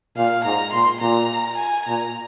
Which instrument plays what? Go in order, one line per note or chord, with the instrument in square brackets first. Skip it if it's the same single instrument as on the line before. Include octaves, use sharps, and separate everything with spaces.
[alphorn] A#2 [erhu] F5
[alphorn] G#2 [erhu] A#5
[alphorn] A#2 [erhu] C6
[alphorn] A#2 [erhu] A#5
[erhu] G#5
[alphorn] A#2 [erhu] A#5